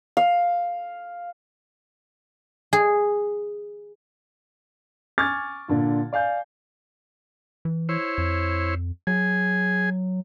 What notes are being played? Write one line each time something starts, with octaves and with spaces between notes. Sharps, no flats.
F5
G#4
G#5 C#6 D6 F6 G#6 A6
A#2 D3 F4
D5 F5 G#5 G6
E3
E4 C5 C#5
F2
F#3 G#4 G#5